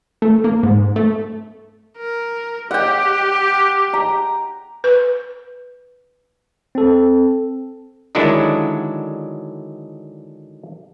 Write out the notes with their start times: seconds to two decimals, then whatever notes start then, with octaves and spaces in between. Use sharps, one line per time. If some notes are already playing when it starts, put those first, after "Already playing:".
0.22 A3
0.44 A#3
0.63 G#2
0.96 A3
1.98 A#4
2.71 G4 F#5 G5
3.93 A#5
4.84 B4
6.75 C4 A4
8.15 D3 D#3 F#3 G#3 D4 E4